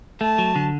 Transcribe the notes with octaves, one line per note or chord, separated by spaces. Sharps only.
A3 A5
F#3
D3